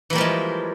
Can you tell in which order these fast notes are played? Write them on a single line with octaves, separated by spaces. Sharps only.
E3 A#3 G3 F3 G#3